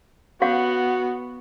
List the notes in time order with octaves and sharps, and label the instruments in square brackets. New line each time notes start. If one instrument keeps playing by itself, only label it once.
[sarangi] B3 [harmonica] F#4 [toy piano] C#5 F5 F#5